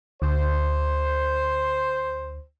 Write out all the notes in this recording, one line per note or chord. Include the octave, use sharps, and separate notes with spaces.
D2 C5